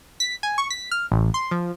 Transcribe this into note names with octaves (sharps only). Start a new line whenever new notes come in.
B6
G#5
C#6
B6
F6
A1
C6
F3